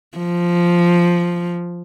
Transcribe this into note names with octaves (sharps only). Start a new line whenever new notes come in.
F3